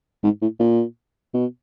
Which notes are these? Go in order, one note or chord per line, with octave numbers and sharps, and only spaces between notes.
G#2
A2
A#2
B2